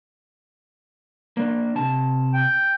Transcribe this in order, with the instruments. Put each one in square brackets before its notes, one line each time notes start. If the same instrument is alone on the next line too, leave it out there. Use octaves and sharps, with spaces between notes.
[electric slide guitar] A#3 D4
C3 A5
[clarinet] G5